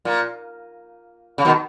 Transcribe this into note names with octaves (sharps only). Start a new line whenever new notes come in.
A#2
C#3
B2 D#3